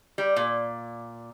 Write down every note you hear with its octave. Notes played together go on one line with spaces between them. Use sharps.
G3
A#2